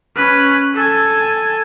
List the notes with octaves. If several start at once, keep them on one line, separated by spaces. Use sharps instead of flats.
C#4 B4
A4 G#5